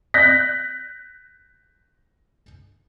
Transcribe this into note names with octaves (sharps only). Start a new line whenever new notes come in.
F#6 G6 A#6 B6